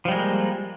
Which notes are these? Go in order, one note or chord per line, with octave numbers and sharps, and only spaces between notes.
F3 G3 G#3 A#3